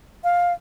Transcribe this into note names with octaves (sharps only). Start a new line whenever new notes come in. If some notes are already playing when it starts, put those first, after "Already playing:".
F5